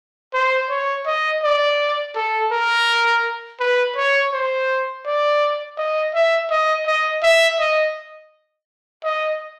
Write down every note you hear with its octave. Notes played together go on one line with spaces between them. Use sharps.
C5
C#5
D#5
D5
A4
A#4
B4
C#5
C5
D5
D#5
E5
D#5
D#5
E5
D#5
D#5